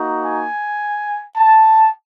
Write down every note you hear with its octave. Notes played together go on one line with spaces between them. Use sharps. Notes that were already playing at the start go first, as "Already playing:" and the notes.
Already playing: A#3 D#4 F#4
G#5
A5